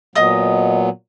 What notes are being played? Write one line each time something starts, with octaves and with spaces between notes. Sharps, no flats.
A#2 F#3 B3 D#5 D#6